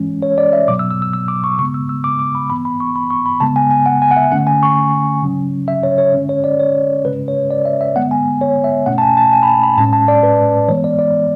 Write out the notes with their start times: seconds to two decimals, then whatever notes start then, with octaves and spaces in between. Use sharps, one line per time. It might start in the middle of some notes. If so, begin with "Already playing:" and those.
Already playing: E3 G#3 C#4
0.22 C#5
0.38 D5
0.53 E5
0.68 B2 F#3 B3 D6
0.79 E6
0.91 E6
1.02 E6
1.13 E6
1.28 D6
1.44 C#6
1.59 C#3 G#3 B3 C#6
1.74 E6
1.89 E6
2.04 D6
2.19 D6
2.35 B5
2.50 E3 B3 B5
2.65 B5
2.80 C#6
2.96 B5
3.11 C#6
3.26 B5
3.40 C#3 G#3 B3 A5
3.56 G#5
3.71 G#5
3.86 F#5
4.02 G#5
4.11 F#5
4.17 E5
4.31 D3 A3 C#4 F#5
4.47 G#5
4.63 C#6
5.23 C#3 F#3 C#4
5.68 E5
5.83 C#5
5.98 C#5
6.14 D3 G#3 C#4
6.29 C#5
6.44 D5
6.59 C#5
7.05 C#3 G#3 C#4 B4
7.28 C#5
7.51 D5
7.65 E5
7.81 E5
7.96 D3 G#3 B3 F#5
8.11 G#5
8.41 C#5
8.64 E5
8.86 B2 A3 C#4 F#5
8.98 A5
9.02 G#5
9.17 A5
9.32 G#5
9.43 B5
9.47 A5
9.63 B5
9.78 A2 G#3 C#4 A5
9.93 A5
10.08 D5
10.23 B4
10.68 E3 G#3 B3 C#5
10.84 D5
10.99 D5